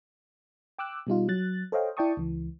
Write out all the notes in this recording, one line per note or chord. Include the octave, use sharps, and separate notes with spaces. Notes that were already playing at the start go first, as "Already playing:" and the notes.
G5 D6 E6 F#6
B2 G3 D#4 F4
F#3 F#6 A6
A4 C5 C#5 D#5 F5 G5
E4 D5 G5 A5 C#6 D#6
C#2 E3